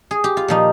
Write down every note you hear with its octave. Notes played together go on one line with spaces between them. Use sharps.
G#4
G4
F4
A#2 F3 D#4